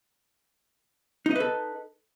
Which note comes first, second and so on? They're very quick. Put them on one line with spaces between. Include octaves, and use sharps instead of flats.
D#4 D#5 B4 A4